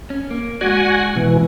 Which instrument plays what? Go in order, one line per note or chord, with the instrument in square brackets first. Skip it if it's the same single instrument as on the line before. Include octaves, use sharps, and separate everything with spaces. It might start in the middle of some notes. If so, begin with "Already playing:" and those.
[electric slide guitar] C#4
A#3
[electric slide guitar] G#3 D5 [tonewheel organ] F#4 F#5 G#5
[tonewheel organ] B2 E3